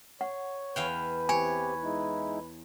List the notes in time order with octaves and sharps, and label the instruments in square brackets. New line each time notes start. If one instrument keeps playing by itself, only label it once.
[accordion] C#5 [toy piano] F#5
[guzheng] E2 F5 G5 [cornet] B4
[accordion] E3 C4 G4 [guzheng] C#5 [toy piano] G#5
[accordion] G#3 D#4 E4